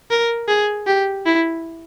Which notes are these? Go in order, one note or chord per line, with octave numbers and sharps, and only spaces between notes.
A#4
G#4
G4
E4